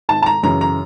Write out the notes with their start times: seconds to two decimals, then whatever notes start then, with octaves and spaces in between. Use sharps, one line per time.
0.09 G#1 A5
0.22 A5
0.26 A#5
0.43 F#2 C#3 E3 A#5
0.61 A#5